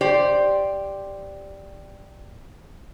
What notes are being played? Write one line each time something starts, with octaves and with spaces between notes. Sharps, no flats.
G4 C5 D5